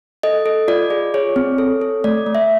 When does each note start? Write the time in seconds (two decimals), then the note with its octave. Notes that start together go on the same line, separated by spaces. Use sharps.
0.23 A4 D#5
0.46 A4
0.68 F4 D5
0.90 G#4
1.14 G#4 C#5
1.36 C4
1.58 A4
1.81 A4
2.04 A3 D5
2.26 A3
2.35 E5